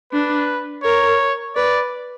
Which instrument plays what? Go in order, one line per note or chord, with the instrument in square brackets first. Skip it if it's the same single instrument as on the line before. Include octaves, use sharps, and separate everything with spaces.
[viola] D4 [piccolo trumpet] B4
[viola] A#4 [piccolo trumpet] C#5
[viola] B4 [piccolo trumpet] D5